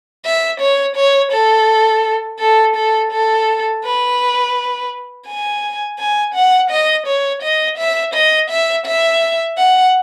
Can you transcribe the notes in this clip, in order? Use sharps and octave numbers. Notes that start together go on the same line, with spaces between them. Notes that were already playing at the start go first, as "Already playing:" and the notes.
E5
C#5
C#5
A4
A4
A4
A4
B4
G#5
G#5
F#5
D#5
C#5
D#5
E5
D#5
E5
E5
F#5